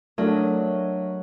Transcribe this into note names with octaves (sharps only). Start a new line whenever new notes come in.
F#3 A3 D4 A#4 D#5